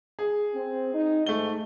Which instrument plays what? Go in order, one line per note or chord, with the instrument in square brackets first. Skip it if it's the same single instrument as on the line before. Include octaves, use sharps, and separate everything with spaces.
[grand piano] G#4
[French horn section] C4
D#4
[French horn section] G#2 [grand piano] A3 G7